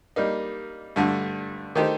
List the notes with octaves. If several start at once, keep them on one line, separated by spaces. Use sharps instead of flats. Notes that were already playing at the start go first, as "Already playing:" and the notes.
G3 A#3 D#4
G2 D3 A3
D#3 A3 D#4 G4 C5